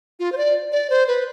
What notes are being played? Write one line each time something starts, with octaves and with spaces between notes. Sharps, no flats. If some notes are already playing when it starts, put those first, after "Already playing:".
F4
C5
D5
D5
C5
B4